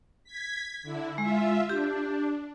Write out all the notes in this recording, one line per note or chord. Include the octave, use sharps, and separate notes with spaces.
G#6 B6
D3 E4
G#3 F4 E5
D4 G4